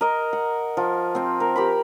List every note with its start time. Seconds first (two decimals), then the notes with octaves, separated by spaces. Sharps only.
0.01 A#4 D#5
0.33 F#5
0.77 F3
1.15 C4 G5
1.40 A#4
1.56 G4 A#4 B5